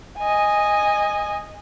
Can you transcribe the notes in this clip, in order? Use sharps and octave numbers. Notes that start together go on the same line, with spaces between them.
D#5 G#5